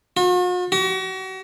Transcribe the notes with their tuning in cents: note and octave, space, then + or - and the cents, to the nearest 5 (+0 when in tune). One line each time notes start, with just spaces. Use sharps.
F#4 -45
F#4 +40